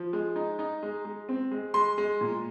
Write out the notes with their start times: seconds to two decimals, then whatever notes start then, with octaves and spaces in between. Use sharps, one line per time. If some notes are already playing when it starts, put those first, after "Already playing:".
Already playing: F3
0.13 G#3
0.36 D#4
0.59 D#4
0.83 G#3
1.05 G#3
1.29 C4
1.51 G#3
1.74 G#3 C6
1.98 G#3
2.21 A#2